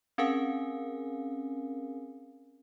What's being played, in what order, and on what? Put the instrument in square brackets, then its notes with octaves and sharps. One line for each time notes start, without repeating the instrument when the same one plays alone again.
[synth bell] C4 C#4 G#4 A#4 F5 G#5